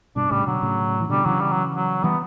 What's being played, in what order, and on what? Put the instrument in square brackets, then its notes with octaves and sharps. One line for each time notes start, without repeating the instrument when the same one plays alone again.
[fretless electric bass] G2 B2 [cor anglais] D4
[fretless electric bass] A2 C#3 [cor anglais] G3
[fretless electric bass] B2 D3 [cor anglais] F#3
[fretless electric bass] A2 C#3
E3
[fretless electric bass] B2 D3 [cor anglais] G3
[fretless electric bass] C#3 E3 [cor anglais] F#3
[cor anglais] G3
F#3
F#3
[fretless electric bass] E3 G3 [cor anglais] B3